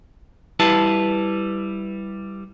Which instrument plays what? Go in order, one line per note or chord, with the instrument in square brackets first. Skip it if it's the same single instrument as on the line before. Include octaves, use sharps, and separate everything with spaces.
[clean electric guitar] G3 E4 B4 A5